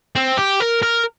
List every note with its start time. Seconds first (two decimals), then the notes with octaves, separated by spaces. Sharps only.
0.16 C4
0.38 G4
0.60 A#4
0.83 A#4